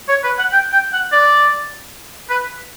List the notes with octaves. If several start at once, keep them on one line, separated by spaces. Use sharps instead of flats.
C#5
B4
F#5
G5
G5
F#5
D5
B4